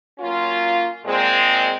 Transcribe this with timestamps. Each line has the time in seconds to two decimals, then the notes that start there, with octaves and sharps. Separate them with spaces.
0.18 F#3 A#3 C#4 F4
1.04 A#2 G#3 C4